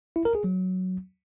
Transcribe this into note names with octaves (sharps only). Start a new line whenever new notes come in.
E4
A#4
G#4
F#3